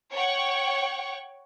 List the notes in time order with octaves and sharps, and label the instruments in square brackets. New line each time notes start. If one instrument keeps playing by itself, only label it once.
[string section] C#5 F#5 G5 C#6